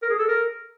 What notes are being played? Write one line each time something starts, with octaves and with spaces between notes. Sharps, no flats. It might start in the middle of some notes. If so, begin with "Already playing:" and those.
A#4
G#4
A4
A#4